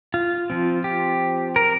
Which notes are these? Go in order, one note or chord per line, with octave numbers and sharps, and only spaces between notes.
F4
F3 C4
G4
A#4